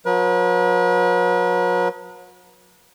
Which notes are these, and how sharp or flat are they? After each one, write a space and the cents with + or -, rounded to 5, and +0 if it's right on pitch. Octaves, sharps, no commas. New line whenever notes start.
F#3 -40 B4 -40